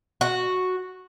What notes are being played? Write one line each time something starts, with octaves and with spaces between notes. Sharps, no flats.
F#4